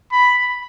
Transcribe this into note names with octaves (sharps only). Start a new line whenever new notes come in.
B5